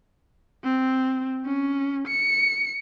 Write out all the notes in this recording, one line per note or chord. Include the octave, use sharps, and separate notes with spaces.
C4
C#4
C#7